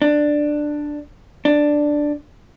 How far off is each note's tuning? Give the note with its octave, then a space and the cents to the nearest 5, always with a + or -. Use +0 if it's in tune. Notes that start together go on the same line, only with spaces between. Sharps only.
D4 +10
D4 +5